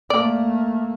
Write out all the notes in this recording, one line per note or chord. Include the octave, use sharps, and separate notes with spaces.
A3 A#3 D5